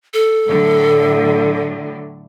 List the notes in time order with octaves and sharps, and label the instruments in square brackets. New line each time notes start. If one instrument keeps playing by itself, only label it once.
[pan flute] A4
[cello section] A2 D3 F#3